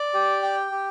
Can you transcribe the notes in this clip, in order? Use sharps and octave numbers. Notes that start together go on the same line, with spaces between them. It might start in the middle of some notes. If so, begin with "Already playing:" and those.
Already playing: D5
G4
G5
G4